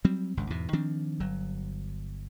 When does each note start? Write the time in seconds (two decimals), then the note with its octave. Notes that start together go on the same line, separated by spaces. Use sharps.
0.04 F#3 G3 C4
0.37 G#1 C#2 G2
0.50 E2 G#2 B2
0.73 D#3 F3 C4 D4
1.20 G1 F#3